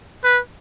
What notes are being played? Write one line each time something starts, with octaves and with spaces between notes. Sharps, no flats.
B4